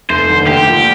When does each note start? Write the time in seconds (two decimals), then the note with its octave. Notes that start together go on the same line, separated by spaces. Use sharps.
0.09 F1 C5
0.29 D#2 D3
0.47 D2 G4
0.67 D3 F3 A#3